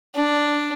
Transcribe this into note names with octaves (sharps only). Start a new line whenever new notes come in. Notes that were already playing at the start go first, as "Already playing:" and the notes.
D4